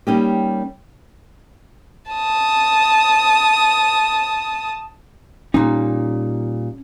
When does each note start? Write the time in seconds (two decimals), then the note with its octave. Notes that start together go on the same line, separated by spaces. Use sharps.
0.07 G3 A#3 C#4 D#4 G4
2.12 A5 D#6
5.54 A#2 G3 C#4 D#4